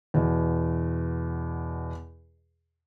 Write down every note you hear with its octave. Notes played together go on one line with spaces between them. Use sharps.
E2 B2